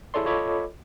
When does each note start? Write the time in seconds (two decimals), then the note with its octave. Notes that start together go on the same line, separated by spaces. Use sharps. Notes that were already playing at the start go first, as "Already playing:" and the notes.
0.14 E4 G#4 A4 C#5 D5 C6
0.25 F4 A4 C#5 D#5 B5 D6